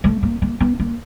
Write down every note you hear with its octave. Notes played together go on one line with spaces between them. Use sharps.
A3
A#3
A#3
B3
A#3